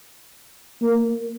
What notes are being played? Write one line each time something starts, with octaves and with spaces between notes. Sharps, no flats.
A#3